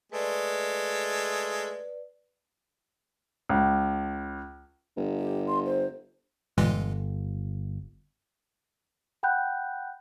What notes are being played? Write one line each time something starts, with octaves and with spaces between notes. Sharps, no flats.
G#3 A3 B4 D5
C#2
G1
G4
C6
C5
G1 A#2 E3 G#3
F#5 G5 B5 F#6 G6